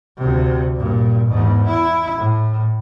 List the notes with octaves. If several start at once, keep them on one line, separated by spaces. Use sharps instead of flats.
D2 C3
G2 A#2
E2 G#2
E4
A2